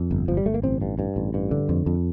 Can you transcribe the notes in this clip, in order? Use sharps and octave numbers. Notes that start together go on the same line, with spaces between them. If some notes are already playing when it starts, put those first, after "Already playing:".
Already playing: F2
G1
G1 F3
G3
G1 A3
A#3
A1 C4
G2
G2
A1
G2
D3
F2
F2